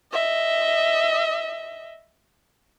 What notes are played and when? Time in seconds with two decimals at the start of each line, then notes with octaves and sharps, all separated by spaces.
0.12 D#5 E5